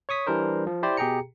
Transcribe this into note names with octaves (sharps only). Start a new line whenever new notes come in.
C#5 C#6 D#6 B6
E3 G3 D4 A#4 C5
F3
E4 G4 C5 D5
B2 G4 G#4 G5 A#5 C#7